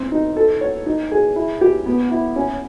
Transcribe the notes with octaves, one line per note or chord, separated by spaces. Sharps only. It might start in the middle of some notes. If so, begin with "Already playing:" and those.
Already playing: C4
D#4
A4
C#5
D#4
G#4
E4
G4
B3
E4
C#4